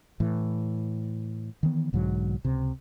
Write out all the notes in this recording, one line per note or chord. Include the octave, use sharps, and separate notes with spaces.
A2 E3
D#3 E3 B3
B1 G#2 D3 F#3
C#2 C3